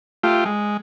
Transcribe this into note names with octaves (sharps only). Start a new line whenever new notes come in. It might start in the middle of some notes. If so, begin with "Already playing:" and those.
A3 F4 G4
G#3